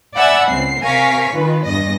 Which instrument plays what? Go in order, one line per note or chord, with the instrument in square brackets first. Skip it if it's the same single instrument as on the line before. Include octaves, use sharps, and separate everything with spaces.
[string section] D5 E5 F#5 G#5 B5 E6
C#2 C4 C7
C3 A#4 F5 G#5 C#6 B6
D#3 F4 B4
E2 G2 D#5 A#6